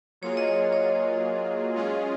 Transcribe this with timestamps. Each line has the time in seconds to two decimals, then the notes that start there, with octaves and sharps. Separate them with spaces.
0.22 F#3 A#3 F4 G#4 C#5
0.37 D#5
0.47 C#5
0.73 C#5
1.75 G#3 C#4 F4 G#4